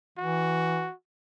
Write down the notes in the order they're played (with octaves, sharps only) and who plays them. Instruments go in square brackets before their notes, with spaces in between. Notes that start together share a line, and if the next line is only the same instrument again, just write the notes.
[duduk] E3 [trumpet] F#4